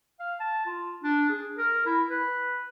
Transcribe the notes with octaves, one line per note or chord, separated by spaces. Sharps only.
F5
A5
F4
D4
G#4
A#4
E4
B4